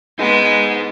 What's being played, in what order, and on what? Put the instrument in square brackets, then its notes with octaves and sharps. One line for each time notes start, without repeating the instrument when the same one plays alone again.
[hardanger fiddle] G#3 B3 [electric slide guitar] D#4 G#4